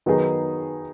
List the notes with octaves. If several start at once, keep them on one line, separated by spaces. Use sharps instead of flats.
D#3 F#3 B3 D#4 G#4